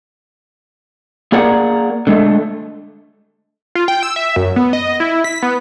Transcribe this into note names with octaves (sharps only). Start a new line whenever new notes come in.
A#3 G#4 A#4 D5 F#5
D3 G#3 A3
F4
G5
E6
E5
F#2
B3
D#5
E4
B6
B3